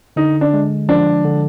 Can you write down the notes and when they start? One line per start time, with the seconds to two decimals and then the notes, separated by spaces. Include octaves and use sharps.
0.16 D3 D#4
0.41 D4
0.53 G#3
0.89 F3 D4
1.25 D3